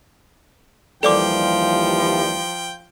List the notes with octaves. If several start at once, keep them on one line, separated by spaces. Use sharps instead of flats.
D#2 E3 F3 G3 A4 D5 G5 D6